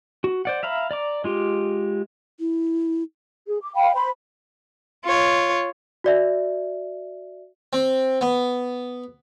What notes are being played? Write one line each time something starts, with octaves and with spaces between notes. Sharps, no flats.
F#4
C5 D5 F#5
E5 F5 A#5 B5
D5 A#5 D6
G#3 F4 G4
E4
G#4
D6
F5 G5 B5
C5 B5
F4 C#5
F#4 D5 E5
C4
B3